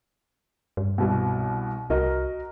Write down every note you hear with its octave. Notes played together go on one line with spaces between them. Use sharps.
G2
C2 B2
C2 F#4 A#4 D#5